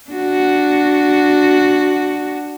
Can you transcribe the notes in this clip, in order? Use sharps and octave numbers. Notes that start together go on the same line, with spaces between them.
D4 F#4